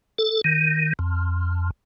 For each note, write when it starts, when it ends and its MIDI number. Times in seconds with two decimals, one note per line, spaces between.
0.18 0.41 69
0.44 0.93 51
0.99 1.70 41